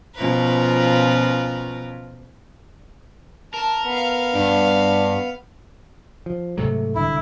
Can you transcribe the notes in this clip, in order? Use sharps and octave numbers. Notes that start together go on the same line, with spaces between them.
B2 F3 C#4 F4 A#4 B4
A#4 A5
B3 F5
G2 D4
F3
G#2 C3 F#3 A3
C2 D3 E4